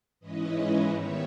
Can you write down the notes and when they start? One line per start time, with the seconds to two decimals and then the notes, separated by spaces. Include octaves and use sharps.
0.20 G#2 E3 G#3 C#4 E4 B4 D#5
0.87 D#3 G3 B3 C#5 E5